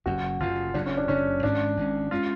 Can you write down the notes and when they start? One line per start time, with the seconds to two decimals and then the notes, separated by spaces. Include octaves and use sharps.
0.06 F#1 F#2 C#3 F#4
0.40 F#1 F#2 C#3 F4
0.74 F#1 F#2 C#3 D4
0.86 C#4
0.97 D4
1.08 F#1 F#2 C#3 C#4
1.43 G#1 G#2 G#3 C#4 D4
1.77 G#1 G#2 G#3 C#4
2.11 G#3 C#4 F4